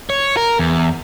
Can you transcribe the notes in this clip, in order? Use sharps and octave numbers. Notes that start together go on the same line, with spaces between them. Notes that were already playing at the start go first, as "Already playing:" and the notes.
C#5
A#4
E2